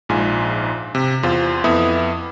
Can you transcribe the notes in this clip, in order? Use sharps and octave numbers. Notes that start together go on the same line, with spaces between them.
A#1 G#2 F4 G#5
C3
E2 F4 C5
F2 B3 E4 E5 D#6